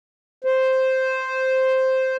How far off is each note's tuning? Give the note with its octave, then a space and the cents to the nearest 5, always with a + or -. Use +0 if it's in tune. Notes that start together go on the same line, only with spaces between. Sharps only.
C5 +0